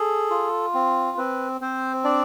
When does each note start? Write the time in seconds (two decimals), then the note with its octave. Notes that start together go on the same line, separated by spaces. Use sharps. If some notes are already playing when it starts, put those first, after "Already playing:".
Already playing: G#4 A4
0.31 F4
0.75 C4
1.17 C4 B4
1.61 C4 C5
2.04 D4 D5